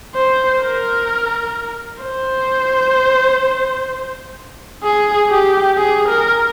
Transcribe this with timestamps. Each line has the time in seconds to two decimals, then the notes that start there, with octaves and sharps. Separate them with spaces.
0.15 C5
0.62 A#4
2.03 C5
4.83 G#4
5.30 G4
5.77 G#4
6.08 A#4